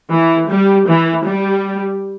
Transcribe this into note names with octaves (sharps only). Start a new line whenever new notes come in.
E3
G3
E3
G3